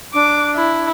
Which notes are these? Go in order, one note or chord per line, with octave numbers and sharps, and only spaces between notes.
D4 D6
E4